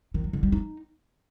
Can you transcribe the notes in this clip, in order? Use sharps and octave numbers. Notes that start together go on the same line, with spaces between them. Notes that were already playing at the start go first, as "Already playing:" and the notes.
D#3
F#3
D3
G3
D#4